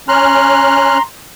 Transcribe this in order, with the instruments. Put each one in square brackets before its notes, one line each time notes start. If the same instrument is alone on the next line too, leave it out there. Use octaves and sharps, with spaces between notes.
[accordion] C#4 F6 F#6 [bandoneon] A#5 C6